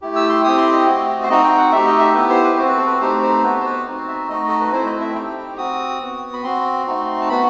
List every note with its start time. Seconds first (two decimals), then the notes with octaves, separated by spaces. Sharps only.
0.02 A3 E4 G4
0.16 E6
0.29 C6
0.44 C4 E4 G4 D#6
0.58 C6
0.72 D#5
0.87 A3 C4 F#4
1.23 C5
1.30 C4 D#4 F#4 D#5
1.44 G5
1.58 F#5
1.72 A3 D#4 G4 E5
1.86 D#5
1.99 E5
2.15 B3 E4 G4 B4
2.30 C5
2.44 B4
2.58 C4 F#4 C5
2.68 B4
2.77 A4
2.87 B4
3.00 A3 C4 D#4 G4 C5
3.23 C5
3.43 B3 F#4 B4
3.60 C5
3.66 B4
3.86 C4 D#4 F#4
4.08 E5
4.29 A3 D#4 F#4 D#5
4.48 A4
4.60 B4
4.72 A3 C4 E4 C5
4.86 D#5
5.01 E5
5.15 C4 D#4 G4 G5
5.58 C4 F#4 D#6
6.01 B3 F#4
6.33 B5
6.43 C4 F#4 C6
6.87 A3 C4 D#4 F#4
7.21 A5
7.29 B3 F#4 B5